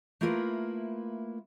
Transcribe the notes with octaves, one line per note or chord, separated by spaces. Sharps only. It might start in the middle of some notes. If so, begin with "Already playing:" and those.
A3 A#3 E4 F4 A#4 B4